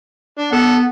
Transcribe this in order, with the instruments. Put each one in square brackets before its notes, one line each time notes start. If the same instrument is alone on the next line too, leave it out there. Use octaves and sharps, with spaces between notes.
[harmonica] D4
[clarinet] B3 [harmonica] A4 F#5